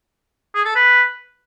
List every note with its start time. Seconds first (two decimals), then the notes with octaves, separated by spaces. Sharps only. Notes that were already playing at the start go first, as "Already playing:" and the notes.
0.55 G#4
0.65 A4
0.75 B4